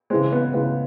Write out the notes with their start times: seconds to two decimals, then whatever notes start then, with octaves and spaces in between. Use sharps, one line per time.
0.10 C#3 E3 G#3 C4
0.32 B3
0.53 C#3 E3 G#3 B3